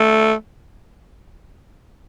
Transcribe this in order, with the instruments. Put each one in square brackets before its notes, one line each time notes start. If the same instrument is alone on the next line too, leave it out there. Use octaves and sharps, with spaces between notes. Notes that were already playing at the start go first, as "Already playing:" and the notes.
Already playing: [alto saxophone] A3